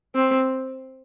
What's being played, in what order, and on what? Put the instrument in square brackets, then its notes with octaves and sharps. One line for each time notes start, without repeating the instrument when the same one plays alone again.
[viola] C4